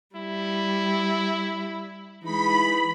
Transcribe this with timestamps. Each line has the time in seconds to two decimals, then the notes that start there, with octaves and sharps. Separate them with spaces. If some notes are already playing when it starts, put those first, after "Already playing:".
0.16 G3 E4
2.24 E3 G#3 D#4 B5